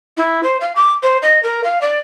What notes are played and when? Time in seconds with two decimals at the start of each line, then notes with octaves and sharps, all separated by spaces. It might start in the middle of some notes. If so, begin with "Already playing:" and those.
0.17 E4
0.43 C5
0.61 F5
0.76 D6
1.03 C5
1.22 D#5
1.43 A#4
1.64 F5
1.81 D5